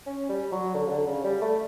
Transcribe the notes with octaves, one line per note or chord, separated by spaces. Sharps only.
C#4
G3
F#3
D3
C#3
D3
C#3
G3
A3